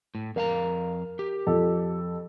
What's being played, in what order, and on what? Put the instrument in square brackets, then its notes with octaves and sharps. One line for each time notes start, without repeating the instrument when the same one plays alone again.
[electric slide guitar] A2
[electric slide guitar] F2 F5 A#5 [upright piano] A#4
[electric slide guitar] G4
[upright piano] F2 A4